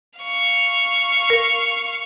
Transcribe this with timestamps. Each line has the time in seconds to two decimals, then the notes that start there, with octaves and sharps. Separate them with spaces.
0.19 F5 C#6
1.30 A#4